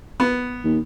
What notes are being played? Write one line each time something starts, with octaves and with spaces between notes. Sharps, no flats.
B3
D#2